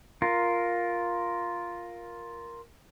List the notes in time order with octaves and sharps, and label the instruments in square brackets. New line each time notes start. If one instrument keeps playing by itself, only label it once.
[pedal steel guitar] F4 A#4